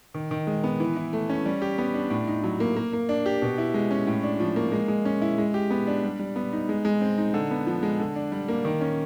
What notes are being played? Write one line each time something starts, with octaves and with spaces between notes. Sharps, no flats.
D#3
D#3
G#3
B3
E3
E4
A3
C#4
G3
G4
B3
D4
A2
D#4
F#3
A#3
A#3
A#3
D4
G4
B2
E4
G#3
C#4
A2
D4
F3
A#3
G#3
G#3
C#4
E4
G#3
G4
B3
D4
G3
G3
B3
D#4
G#3
G#3
C4
D#4
D3
B3
F3
G#3
D3
D4
G3
A#3
D#3
C#4